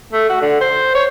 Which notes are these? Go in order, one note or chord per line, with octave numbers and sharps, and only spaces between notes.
A3
F#4
D3
C5
C#5